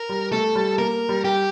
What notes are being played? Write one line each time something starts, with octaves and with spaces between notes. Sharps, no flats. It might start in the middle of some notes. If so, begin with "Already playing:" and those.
Already playing: A#4
G3
A3 A4
G3
A#3 A#4
G3
G4